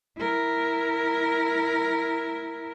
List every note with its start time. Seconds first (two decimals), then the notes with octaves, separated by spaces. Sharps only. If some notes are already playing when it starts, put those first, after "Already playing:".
0.17 E4 A#4